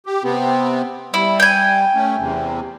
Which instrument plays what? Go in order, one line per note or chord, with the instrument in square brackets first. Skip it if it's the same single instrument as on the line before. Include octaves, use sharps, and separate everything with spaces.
[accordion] G4
C3 B3 C4
[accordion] G3 [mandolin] E4
[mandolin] G5 G#5
[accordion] A3 C#4
E2 C3